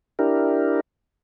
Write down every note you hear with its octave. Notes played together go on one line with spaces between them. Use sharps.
D4 E4 G4 A#4